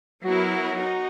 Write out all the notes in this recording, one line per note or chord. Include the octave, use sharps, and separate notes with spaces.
F#3 B3 E4 F#4 A#4
D#4